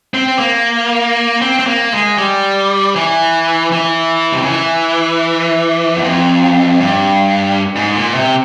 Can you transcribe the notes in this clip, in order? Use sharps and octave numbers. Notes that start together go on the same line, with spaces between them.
C4
A#3
C4
C4
A#3
G#3
G3
E3
E3
C3
C#3
E3
E2
F2
G2
G#2
A#2
C3